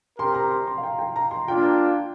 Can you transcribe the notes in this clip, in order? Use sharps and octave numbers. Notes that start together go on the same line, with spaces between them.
C4 G4 A#4 C6
A#5
C6
C6
F5
G5
G5
A#5
C6
A#3 D4 F4 G5